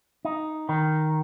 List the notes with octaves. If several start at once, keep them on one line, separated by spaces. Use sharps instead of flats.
D#4
D#3